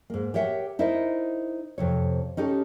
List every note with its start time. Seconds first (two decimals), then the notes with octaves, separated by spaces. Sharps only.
0.10 G#2 A#3
0.34 G4 A#4 C#5 E5 F#5 G5
0.79 D#4 E4 A#4 C5 D#5
1.78 F2 C3 C#5
2.37 C#4 D#4 G4 A4